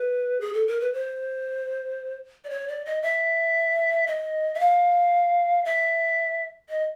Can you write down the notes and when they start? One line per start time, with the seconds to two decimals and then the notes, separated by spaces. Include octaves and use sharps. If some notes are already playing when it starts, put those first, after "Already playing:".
Already playing: B4
0.40 G#4
0.53 A4
0.67 A#4
0.80 B4
0.93 C5
2.44 D5
2.50 C#5
2.68 D5
2.85 D#5
3.02 E5
4.07 D#5
4.55 E5
4.60 F5
5.65 E5
6.69 D#5